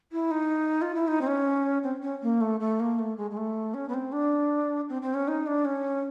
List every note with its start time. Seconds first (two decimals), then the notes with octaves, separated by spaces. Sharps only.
0.12 E4
0.31 D#4
0.82 F4
0.95 E4
1.08 D#4
1.21 C4
1.27 C#4
1.83 C4
2.02 C#4
2.22 A#3
2.41 A3
2.60 A3
2.80 A#3
2.99 A3
3.17 G#3
3.31 G#3
3.37 A3
3.74 C#4
3.89 B3
3.94 C4
4.12 D4
4.89 C4
5.02 C4
5.14 C#4
5.28 D#4
5.47 D4
5.65 C#4